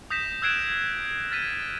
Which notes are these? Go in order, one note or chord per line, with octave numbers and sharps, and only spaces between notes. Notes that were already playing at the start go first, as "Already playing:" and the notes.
D#6 G6 A#6 B6 E7
E6 F#6 G#6 C7 D7 E7
F6 A6 B6 D#7